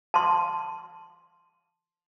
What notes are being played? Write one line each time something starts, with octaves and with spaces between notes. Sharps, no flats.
A5 C6